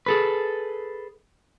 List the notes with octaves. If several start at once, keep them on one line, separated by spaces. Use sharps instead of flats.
G#4 A4 B4